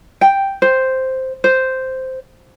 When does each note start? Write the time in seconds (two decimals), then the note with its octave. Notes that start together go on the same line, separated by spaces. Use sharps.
0.21 G5
0.62 C5
1.44 C5